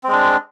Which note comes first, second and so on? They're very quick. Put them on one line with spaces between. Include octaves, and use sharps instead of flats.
C4 G#3 D4